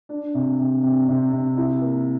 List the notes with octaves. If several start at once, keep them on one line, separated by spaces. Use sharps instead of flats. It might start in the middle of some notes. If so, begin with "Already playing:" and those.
D4
C3
C3
C3
C3
C3
E4
A#3